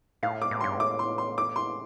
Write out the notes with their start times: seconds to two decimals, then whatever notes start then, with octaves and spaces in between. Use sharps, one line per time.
0.23 A2 F5
0.42 D6
0.51 A2
0.61 G2 C6
0.78 A2 D6
0.99 C6
1.18 C6
1.38 D6
1.56 C6